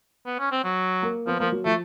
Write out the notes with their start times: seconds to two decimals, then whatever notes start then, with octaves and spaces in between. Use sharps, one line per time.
0.26 B3
0.39 C#4
0.52 C4
0.64 F#3
1.03 A#3
1.27 F3 B3
1.40 F3 A#3
1.52 F#3
1.65 F3 A3